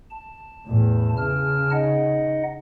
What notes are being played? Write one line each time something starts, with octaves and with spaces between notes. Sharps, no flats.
A5
E2 A2
C#3 A5 F6
D#4 D#5 F#5